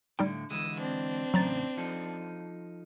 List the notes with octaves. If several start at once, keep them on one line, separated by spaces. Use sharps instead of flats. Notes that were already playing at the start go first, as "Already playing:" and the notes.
A2 D3 G3 D#4 G5
D3 E3 G#3 D#6 E6
C4 D4
E2 A2 C#3 F#3 A#5 A6
F3 D#4 A4